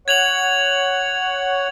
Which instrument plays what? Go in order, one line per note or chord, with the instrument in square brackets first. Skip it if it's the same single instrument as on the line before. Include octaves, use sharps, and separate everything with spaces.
[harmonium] C#5 F#5 [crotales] G#6 F7 F#7